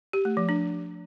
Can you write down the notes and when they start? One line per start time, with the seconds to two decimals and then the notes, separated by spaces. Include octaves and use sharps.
0.13 G4
0.25 A3
0.37 F3
0.49 D4